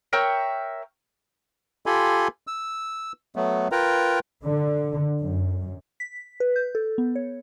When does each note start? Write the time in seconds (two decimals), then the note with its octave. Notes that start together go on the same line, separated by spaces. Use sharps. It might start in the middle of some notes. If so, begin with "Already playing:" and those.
0.13 A#4 C#5 E5 G5
1.86 F4 G4 A4 G#5 B5 C6
2.47 E6
3.36 F#3 A3 B3
3.72 F4 A#4 B4 G5 A#5
4.43 D3
5.20 F#2
6.00 B6
6.40 B4
6.56 G6
6.75 A4
6.98 B3
7.15 C#5